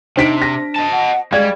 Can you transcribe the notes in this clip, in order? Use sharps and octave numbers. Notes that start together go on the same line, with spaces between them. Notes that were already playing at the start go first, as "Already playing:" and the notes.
C3 D4 D#4 C5 B6 D7
A#6
D#5 A5
F#5
G3 G#3 G#4 D5 F5 G#6